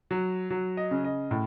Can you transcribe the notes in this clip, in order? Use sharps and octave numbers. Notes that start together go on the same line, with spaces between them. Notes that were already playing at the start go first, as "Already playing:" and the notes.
F#3
F#3
D#5
C#3
D#5
A2